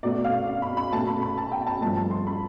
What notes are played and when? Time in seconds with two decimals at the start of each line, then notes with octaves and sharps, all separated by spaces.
0.03 B2 A3 D5
0.24 F5
0.47 F5
0.62 B5
0.77 B5
0.92 B2 A3 A5
1.07 B5
1.22 B5
1.38 A5
1.52 G5
1.67 A5
1.81 G2 F3 A3 A5
1.97 A5
2.11 C6
2.27 B5